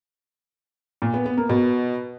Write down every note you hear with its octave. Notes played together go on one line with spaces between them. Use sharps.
A#2
B3
B3
A#3
B2